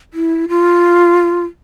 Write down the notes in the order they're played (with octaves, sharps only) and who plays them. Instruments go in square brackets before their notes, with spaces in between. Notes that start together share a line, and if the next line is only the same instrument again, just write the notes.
[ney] E4
F4